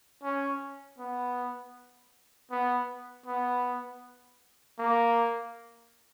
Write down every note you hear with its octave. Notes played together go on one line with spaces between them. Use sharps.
C#4
B3
B3
B3
A#3